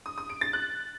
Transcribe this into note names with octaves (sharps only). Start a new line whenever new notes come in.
D#6
D#6
D7
A6
F#6